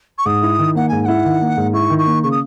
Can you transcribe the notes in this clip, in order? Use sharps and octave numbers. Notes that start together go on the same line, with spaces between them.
C#6
G#2 D#6
E4
D#3
A#3 F#5
G#2 G#5
G#5
E4 F#5
D#3
A#3
G#2
E4 C#6
D#3
C#6
A#3
C#3 C#6
D#6